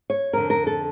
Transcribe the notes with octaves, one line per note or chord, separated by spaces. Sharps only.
C#5
F2 D3 A#4
A#4
A4